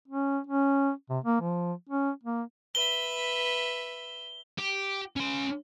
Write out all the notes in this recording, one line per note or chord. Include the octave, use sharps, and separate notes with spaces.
C#4
C#4
C3
A#3
F3
C#4
A#3
B4 E5 G7
G4
C#4 C6